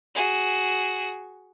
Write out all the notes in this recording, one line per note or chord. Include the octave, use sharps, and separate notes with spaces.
F#4 G#4